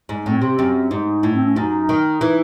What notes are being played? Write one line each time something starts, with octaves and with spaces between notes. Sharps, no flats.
G#2
A2 C4
C3
F#2 C4
G#2 D#4
A2 E4
C4
C#4
F#2 D#4
D#3
E3